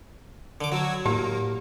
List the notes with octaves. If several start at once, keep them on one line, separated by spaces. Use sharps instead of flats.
D3 D6
F#3 F#4 E6 G#6
A2 A#3 G4